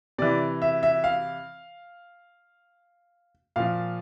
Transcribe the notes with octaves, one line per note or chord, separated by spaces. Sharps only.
C3 E3 D5
E5
E5
F5
A#2 F3 F5